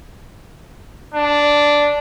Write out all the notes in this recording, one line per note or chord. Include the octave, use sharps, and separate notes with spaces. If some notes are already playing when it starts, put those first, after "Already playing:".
D4